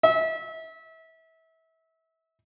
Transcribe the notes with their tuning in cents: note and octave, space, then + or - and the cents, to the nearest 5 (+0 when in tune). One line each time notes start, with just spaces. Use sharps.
E5 -30